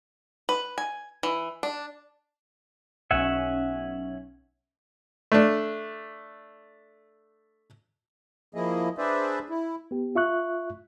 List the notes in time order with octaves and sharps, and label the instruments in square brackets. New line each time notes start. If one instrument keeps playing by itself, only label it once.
[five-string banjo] B4
G#5
E3
D4
[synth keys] B1 C#4 [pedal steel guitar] E5 F#5 G#5
[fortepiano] A3 D4
[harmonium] F3 A#3 E4 G#4 D#5
D4 G#4 B4 C5 D5 E5
E4
[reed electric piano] B3 G4
F4 E5 C#6 F#6